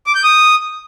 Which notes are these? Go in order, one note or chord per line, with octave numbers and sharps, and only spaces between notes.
D6
G6
D#6